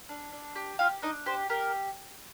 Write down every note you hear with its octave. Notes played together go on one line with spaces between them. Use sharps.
D4
D4
G4
F4 G4 F5
D4 D#4 D#5
G4 C5
G4 A#4